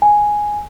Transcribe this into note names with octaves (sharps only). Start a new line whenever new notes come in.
G#5